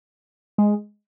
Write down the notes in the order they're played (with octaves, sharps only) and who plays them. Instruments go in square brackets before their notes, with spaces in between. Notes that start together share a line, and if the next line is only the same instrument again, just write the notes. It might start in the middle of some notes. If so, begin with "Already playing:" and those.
[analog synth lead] G#3